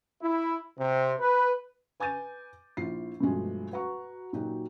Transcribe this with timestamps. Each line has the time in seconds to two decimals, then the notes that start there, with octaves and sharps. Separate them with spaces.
0.21 E4
0.78 C3
1.19 B4
2.00 B4 G#5 D6 G6 A6 D#7
2.77 A#1 E4 F4 C7
3.20 G2 B2 F3 G#3 A3
3.71 F#4 B4 F#5 A#5 C#6
4.33 A#2 F#3 D#4 F#4 G4